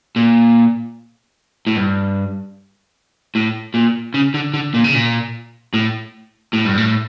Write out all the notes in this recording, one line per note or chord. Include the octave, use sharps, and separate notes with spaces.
A#2
A2
G2
A2
A#2
C#3
D3
D3
A#2
C#3
A#2
A2
A2
G2
A2